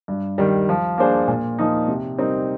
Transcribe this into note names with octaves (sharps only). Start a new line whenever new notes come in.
G2
D#3 G3
F3
A#3 D4 G#4 C5
A#2
F3 A#3 D#4
C3
G3 C4 D#4 A#4